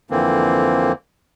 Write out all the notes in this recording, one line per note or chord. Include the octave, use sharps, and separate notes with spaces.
F2 D3 E3 A#3 C4